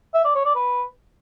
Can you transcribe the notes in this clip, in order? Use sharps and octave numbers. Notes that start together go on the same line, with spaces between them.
E5
D5
C#5
D5
B4